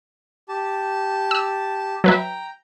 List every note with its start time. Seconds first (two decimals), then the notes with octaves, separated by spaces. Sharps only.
0.49 G4 A5
1.31 E6
2.04 F#3 B4 E5 G5 A#5